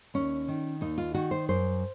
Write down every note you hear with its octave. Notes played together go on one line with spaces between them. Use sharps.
D#2 C#4
D#3
D#2 D#4
F4
D#3 F#4
C5
F#2 C5